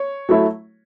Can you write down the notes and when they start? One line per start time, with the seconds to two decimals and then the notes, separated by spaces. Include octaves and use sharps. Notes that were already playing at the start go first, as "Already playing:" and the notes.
Already playing: C#5
0.29 F#3 A3 E4